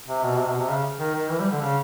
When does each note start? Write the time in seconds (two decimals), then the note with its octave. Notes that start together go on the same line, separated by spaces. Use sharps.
0.07 C3
0.23 B2
0.38 C3
0.48 B2
0.59 C3
0.68 C#3
0.99 D#3
1.15 D#3
1.30 E3
1.40 G3
1.51 D3
1.61 C#3